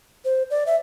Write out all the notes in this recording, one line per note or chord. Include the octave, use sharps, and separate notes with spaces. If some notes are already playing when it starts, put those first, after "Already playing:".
C5
D5
E5